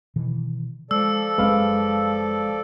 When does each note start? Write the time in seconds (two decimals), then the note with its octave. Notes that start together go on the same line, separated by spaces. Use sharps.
0.16 B2 D#3 E3
0.91 F3 G#3 A4 D5 E6
1.38 F#1 G#3 C4 C#4 B4 F5